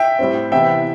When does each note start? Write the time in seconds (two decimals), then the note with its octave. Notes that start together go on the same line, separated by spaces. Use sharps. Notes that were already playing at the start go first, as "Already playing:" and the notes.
Already playing: E5 G5
0.19 A2 G3 C4
0.52 C3 E3 B3 E5 G5